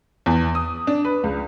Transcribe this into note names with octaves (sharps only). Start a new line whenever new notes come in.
E2
D#6
D4
B4
C#2